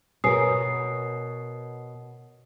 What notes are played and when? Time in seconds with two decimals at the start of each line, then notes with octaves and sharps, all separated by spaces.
0.24 B2 A#4 B4 C#5 G#5 D#6 C7